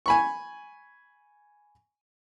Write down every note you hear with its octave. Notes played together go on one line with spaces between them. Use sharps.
G#5 B5 C#6